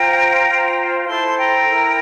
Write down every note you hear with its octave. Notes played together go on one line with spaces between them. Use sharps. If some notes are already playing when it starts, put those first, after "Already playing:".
Already playing: F4 C5 G5 A#5
F4 C5
E4 A4 C5 A5 C6
C6
G5 A#5
E4 A#4